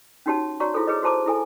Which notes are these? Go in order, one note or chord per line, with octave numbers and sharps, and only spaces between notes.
C#4 D#4 F#4 G4 C#5 A5
F#4 C#5 D5 A#5 C#6
E4 F4 G#4 A4 C5
G#4 B4 C#5 D#5
F#4 A4 C5 A5 A#5 D6
E4 A4 G#5